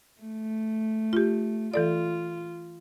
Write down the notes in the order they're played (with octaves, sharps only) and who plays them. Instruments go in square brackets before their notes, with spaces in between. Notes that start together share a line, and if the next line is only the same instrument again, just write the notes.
[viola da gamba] A3
[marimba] F4 G4
[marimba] E3 A4 D5 [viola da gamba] F4